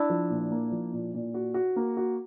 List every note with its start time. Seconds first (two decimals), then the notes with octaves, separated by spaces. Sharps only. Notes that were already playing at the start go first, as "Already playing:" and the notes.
Already playing: D4 E4
0.10 F3
0.30 A#2
0.51 A#3
0.72 F3
0.93 A#2
1.14 A#2
1.34 F#4
1.54 F#4
1.76 A#3
1.97 F#4